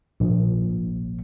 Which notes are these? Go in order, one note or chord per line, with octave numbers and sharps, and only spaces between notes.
A#1